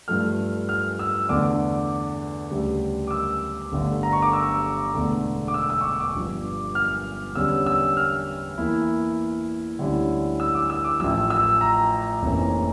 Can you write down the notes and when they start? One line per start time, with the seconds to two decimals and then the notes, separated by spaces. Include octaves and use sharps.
0.08 G2 F3 A3 F6
0.69 F6
0.99 E6
1.29 E2 D3 A3 D4 D6
2.51 D2 C#3 G3
3.07 D6
3.11 E6
3.72 G1 G2 D3 A3
4.03 A#5
4.13 C#6
4.22 D6
4.33 E6
4.94 E1 E2 D3 A3
5.48 D6
5.54 E6
5.70 E6
5.81 C#6
5.84 D6
6.00 D6
6.14 G1 G2 F3
6.75 F6
7.35 E2 D3 G3 C#4 E6
7.66 E6
7.97 F6
8.57 E2 E3 A#3 E4
9.79 D2 D3 G3 C#4 E4
10.40 E6
10.55 D6
10.70 E6
10.84 D6
11.00 A1 A2 F3 E6
11.30 E6
11.61 A#5
12.22 F1 F2 E3 A#3 C#4